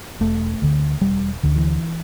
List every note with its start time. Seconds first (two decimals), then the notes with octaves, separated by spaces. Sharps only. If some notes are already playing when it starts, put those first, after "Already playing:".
0.20 E1 A3
0.62 D2 D3
1.01 E1 G3
1.43 D2 D3
1.56 E3